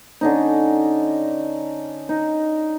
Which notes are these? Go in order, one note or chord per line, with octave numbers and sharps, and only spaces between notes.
D3 C#4 D#4
D#4